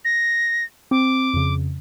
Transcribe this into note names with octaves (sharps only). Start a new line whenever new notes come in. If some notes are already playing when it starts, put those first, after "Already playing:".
A#6
C4 D6
F2 C#3